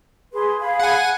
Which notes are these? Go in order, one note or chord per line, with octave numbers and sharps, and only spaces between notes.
G#4 B4 C6
G#4 F5 B5
F#5 G#5